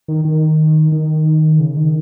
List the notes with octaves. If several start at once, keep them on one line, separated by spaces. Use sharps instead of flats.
D#3
D#3
D#3
C#3
D#3